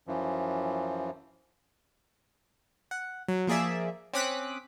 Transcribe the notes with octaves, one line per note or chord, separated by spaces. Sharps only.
F#2 E3 F3
F#5
F#3
F3 A#3 G#4 D5 E5
C4 C#4 D6 D#6 F#6 B6